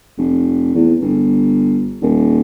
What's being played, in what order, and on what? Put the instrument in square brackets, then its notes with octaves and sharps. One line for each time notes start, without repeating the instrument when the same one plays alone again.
[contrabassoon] F1
E2
G1
D#1